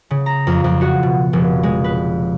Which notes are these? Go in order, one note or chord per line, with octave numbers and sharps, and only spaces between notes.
C#3
A#5
F2
F2
F#4
B2
F1
G#3
B4